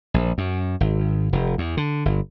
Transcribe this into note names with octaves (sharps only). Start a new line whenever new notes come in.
A#1
F#2
G#1
F1
E2
D3
G1